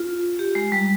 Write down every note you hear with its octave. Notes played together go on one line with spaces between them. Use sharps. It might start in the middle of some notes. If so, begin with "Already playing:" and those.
Already playing: F4
G4
G#3
G3